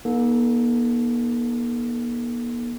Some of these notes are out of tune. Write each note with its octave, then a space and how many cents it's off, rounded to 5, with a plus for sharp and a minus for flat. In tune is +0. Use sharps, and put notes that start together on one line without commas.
A#3 +45 D#4 +0 A4 -15